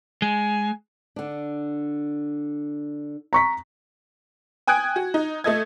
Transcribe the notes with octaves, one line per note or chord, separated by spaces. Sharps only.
G#3 G#5
D3 D4
A#5 C#6 B6
G5 G#5 D#6 F#6 G#6 D7
F#4
D#4
A3 A4 D#5 G#6